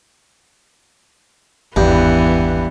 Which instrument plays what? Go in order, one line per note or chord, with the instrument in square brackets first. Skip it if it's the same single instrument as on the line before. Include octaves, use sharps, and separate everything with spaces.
[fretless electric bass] G#1 E2 [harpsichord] G2 [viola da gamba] E3 B3